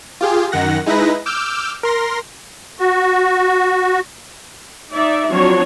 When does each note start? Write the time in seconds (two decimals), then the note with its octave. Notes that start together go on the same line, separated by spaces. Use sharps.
0.21 F4 G4 G#4
0.52 F#2 D#3 F#5 A#6
0.86 G#3 D#4 E4 B4 A#6
1.26 D6 E6 F6 G6
1.83 A#4 C6 A#6
2.80 F#4
4.92 D#4 D5 E5
5.30 F3 F#3 C4 D4 F#4 C#5